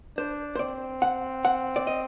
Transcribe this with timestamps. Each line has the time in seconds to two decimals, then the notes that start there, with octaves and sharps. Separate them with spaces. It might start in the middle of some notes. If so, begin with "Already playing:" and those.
0.17 D4 C5
0.56 C5
0.59 C4 D5
1.02 F#5
1.45 F#5
1.76 D5
1.87 D#5